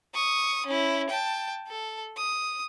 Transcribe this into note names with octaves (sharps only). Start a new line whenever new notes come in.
C#6 D#6
C#4 E4
G5 A5
A4
D#6